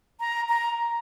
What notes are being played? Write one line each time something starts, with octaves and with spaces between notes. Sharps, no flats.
A#5
A#5